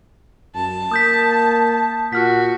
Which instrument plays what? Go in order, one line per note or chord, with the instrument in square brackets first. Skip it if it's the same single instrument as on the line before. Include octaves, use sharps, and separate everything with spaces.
[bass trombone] F#2 [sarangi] A5
[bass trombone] A#3 [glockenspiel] D#6 G6 B6
[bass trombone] A#2 [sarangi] F#4 [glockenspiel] F6 B6